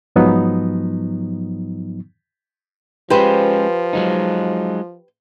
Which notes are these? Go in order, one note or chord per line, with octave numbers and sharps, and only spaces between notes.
G#2 F3 F#3 B3 D#4
F3 G#3 C#4 G4 B4 C5
F#3 G#3 D#4